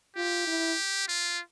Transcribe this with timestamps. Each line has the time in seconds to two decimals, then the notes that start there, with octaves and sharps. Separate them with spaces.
0.16 F4 G4
0.47 E4
1.08 F4